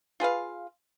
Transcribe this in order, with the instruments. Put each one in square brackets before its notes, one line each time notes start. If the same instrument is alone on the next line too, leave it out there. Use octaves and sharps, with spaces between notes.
[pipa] F4 G#4 B4 F5